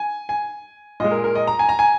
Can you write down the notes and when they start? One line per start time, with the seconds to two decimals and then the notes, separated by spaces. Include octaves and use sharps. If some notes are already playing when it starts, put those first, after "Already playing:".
Already playing: G#5
0.29 G#5
1.00 A#2 G#3 D#5
1.12 A#4
1.24 A#4
1.35 D#5
1.47 A#5
1.59 G#5
1.69 A#5
1.79 G#5